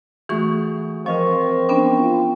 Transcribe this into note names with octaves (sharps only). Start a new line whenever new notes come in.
E3 A3 F#4 G#4 C#6
F3 C4 A#4 D#5 C#6
B3 C#4 D4 G5
F4